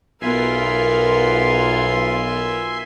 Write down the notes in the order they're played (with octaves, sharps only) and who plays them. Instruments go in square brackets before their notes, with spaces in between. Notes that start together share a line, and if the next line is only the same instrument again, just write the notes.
[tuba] B1 [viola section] B3 F4 A#4 [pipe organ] E5 G#5 C6